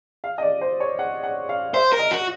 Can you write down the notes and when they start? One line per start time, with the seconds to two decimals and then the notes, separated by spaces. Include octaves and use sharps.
0.24 F5
0.38 D#5
0.42 D5
0.61 C5
0.80 C#5
0.99 F#5
1.23 F#5
1.49 F5
1.74 C5 E5
1.93 A#4
1.99 D#5
2.11 F#4